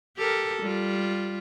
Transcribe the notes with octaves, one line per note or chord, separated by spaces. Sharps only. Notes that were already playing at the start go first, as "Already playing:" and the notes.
G4 A4 A#4
G3 F4